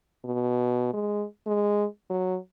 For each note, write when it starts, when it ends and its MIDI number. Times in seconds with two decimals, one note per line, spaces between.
0.25 0.92 47
0.93 1.25 56
1.47 1.85 56
2.10 2.37 54